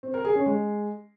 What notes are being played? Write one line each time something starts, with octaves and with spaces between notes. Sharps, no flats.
C4
A#4
G#4
C#4
G#3